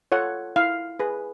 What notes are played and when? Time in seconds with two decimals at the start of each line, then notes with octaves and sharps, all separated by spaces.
0.12 F4 A4 C#5 F#5
0.56 E4 F5
0.99 G#4 B4